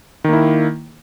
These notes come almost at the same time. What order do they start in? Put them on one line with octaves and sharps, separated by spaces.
D#3 A#3 E4